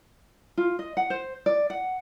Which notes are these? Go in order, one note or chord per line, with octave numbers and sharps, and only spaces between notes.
F4
D#5
F#5
C5
D5
F#5